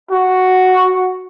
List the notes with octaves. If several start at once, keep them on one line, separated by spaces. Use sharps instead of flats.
F#4